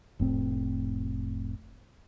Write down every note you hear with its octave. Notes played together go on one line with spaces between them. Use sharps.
F1 A2 C4